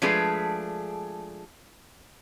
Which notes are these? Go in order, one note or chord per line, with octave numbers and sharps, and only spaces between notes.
F3 G#3 A3 D4 G#4 B4